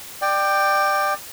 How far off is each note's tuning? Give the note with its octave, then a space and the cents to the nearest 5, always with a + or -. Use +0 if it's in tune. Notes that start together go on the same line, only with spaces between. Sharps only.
D5 +20 G5 +0